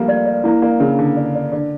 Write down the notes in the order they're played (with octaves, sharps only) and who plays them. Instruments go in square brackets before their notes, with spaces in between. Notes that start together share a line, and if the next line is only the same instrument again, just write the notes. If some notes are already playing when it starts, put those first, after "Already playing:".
Already playing: [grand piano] F3 G3 A3 A#3
[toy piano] D5
D5
[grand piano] A#3 [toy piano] E4
[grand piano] A#3 [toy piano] D5
[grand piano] C#3 [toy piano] A#4
[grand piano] D3 [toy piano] A5
[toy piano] D5
D5
[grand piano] D3 [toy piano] D5